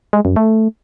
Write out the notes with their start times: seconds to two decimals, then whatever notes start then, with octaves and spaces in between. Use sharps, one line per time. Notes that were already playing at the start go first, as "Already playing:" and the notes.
0.13 G#3
0.25 F#2
0.36 A3